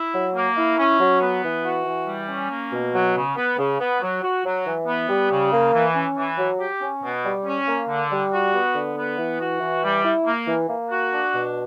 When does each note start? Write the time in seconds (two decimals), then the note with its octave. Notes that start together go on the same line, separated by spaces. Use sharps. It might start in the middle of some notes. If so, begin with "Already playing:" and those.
Already playing: E4
0.14 F#3
0.35 A#3
0.57 E4
0.78 C#4
0.99 F#3
1.21 B3
1.43 E3
1.65 F#4
1.86 E3
2.08 G3
2.29 C#4
2.51 A#3
2.72 B2
2.94 F#3
3.15 C#3
3.36 B3
3.58 C#3
3.80 B3
4.01 F#3
4.23 F#4
4.45 F#3
4.66 E3
4.87 B3
5.09 G3
5.31 C#3
5.52 A#3
5.73 E3
5.95 C#4
6.16 E3
6.38 F#3
6.60 G4
6.81 C#4
7.03 B2
7.24 G3
7.46 C#4
7.67 A#3
7.88 D3
8.11 G3
8.32 F#4
8.54 B3
8.75 D3
8.97 B3
9.18 E3
9.40 F#4
9.61 E3
9.83 G3
10.04 E4
10.26 A#3
10.47 E3
10.69 A#3
10.90 F#4
11.12 D4
11.34 B2